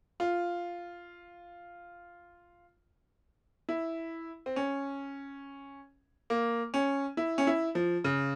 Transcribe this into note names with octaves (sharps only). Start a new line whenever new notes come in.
F4
E4
C4
C#4
A#3
C#4
E4
C#4
E4
F3
C#3